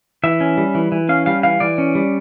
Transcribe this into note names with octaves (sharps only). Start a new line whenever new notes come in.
E3 E5
C#4
G3
E3
E3
C#4 F5
G3 F5
E3 F5
E3 D5
C#4
G3